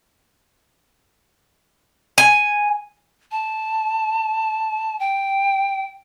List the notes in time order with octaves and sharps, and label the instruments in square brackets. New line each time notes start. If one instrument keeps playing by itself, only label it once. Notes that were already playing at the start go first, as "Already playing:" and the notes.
[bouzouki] G#5
[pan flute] A5
G5